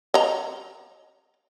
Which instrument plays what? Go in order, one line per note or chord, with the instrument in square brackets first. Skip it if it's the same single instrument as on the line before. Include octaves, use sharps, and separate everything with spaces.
[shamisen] D#5 A#5